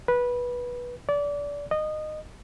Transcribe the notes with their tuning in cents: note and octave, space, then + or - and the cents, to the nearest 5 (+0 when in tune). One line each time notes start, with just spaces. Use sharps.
B4 -15
D5 -25
D#5 -20